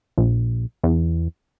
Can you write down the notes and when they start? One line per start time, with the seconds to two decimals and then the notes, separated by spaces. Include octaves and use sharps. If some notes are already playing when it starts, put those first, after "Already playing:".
0.18 A#1
0.83 E2